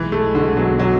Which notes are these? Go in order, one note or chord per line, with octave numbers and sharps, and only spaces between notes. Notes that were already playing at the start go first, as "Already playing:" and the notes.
Already playing: B1 B2 E3 G#3
A3
D3
F#3
F#3